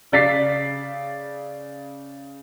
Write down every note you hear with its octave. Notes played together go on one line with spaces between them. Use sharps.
C#3 D5 A6 B6 C7